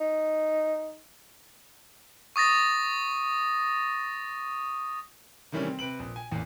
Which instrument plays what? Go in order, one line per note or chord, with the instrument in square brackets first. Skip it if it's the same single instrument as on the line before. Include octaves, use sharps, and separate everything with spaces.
[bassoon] D#4
[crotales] C#6 D#6 A6 A#6
[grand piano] C3 D#3 E3 G3 A3 C#4
C4
C3 B4 D7 F#7
A#1
G#5
A1 E2 A#2